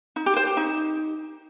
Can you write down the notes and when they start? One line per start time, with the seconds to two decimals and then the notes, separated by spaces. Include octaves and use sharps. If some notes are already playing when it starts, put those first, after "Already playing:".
0.16 D#4
0.26 G4
0.37 C5
0.47 G4
0.57 D#4